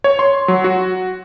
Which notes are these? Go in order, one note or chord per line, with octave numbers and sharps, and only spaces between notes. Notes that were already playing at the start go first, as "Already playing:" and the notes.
C#5
C6
F#3
F#4